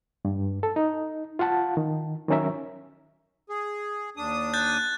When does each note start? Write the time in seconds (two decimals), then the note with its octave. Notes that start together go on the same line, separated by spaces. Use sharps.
0.25 G2
0.63 A4
0.76 D#4
1.39 F4 F5 F#5 A5
1.77 D#3
2.29 D#3 F#3 C#4 A#4 E5
3.49 G#4
4.17 D#2 D4 D#6
4.54 F#6 G6 A6